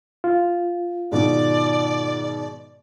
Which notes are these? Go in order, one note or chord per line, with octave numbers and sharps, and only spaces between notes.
F4
G#2 B2 D#3 D5